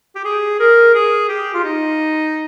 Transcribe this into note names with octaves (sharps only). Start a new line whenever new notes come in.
G4
G#4
A#4
G#4
G4
F4
D#4